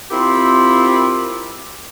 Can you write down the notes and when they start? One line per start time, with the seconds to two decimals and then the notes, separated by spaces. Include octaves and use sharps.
0.10 C4 E4 F4 G4 A#4